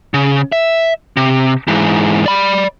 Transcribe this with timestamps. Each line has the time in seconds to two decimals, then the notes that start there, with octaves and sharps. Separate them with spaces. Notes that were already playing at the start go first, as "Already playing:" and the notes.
0.14 C#3
0.52 E5
1.17 C3
1.68 G#2 E3
2.26 D5 B5